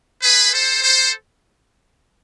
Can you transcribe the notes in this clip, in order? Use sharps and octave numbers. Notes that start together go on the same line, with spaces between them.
G#4 B4
A4 C5
A4 C5